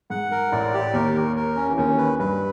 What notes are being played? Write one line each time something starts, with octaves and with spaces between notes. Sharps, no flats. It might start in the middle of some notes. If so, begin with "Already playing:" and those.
G#2 F#5
A#4
A1 A2 D5
G4
D#2 D#3 A#4
A#4
A#4
C#4
E3
D#2 D#3 C#4
B4
G2 G3 B4